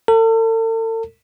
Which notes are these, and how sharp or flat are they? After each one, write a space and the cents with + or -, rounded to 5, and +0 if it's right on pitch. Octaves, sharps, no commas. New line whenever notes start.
A4 +40